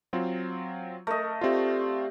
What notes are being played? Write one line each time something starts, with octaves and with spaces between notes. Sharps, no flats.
F#3 C4 F4
A3 A#4 D#5
C4 F4 G4 D5 E5